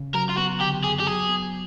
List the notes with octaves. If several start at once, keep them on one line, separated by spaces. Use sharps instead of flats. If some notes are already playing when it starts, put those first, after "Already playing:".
Already playing: C#3
F#3 A#4
F4
B3 F#4
D3 G4
F#2 G#4
G4
F#3 G#4
B3